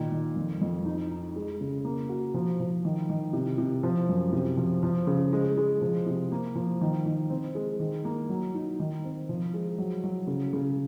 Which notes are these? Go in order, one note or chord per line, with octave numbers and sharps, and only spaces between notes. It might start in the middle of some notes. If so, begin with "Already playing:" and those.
Already playing: A#2 D#3
D#3
F2
F2
D#4
D#4
G#3
C#3
A#3
F#4
F3
F3
D#3
D#3
C3
C3
F3
F#2
C3
F3
F3
C#3
G#3
G#3
F3
C3
A#3
F3
D#3
D#3
C4
G#3
D#3
A#3
F#3
D#4
D#3
C4
F3
G#3
F#3
F#3
C#3
C#3